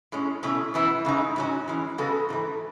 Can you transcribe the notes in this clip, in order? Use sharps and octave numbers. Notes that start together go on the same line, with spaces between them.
A2 G#3 C#4
B2 A3 C#4 E4
F#2 E3 B3 E4
C#3 G#3 D#4
G#2 F#3 C#4
E3 G#3 C#4
C#3 G#3 B3 F#4 A4
G#2 E3 A3